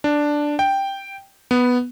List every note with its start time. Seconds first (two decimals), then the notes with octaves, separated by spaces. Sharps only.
0.04 D4
0.59 G5
1.51 B3